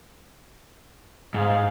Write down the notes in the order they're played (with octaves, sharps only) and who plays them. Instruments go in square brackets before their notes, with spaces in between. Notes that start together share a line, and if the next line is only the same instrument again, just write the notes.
[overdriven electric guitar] G#2 [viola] G#4 F5